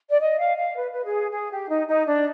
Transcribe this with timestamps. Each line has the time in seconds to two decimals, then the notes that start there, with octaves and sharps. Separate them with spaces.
0.09 D5
0.19 D#5
0.38 F5
0.57 F5
0.76 B4
0.92 B4
1.04 G#4
1.31 G#4
1.50 G4
1.69 D#4
1.87 D#4
2.06 D4